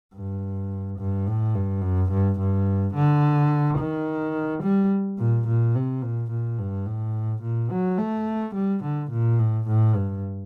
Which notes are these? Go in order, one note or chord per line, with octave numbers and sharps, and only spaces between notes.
G2
G2
A2
G2
F#2
G2
G2
D3
D#3
G3
A#2
A#2
C3
A#2
A#2
G2
A2
A#2
F#3
A3
G3
D3
A#2
A2
A2
G2